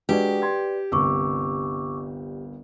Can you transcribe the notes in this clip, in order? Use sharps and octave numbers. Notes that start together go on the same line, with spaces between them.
G#3 D4 F#4 G4 B4 D5
C6 G#6
G1 C2 C#6 D6 E6